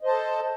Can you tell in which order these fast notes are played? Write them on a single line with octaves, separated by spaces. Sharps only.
D#5 C5 A5 A4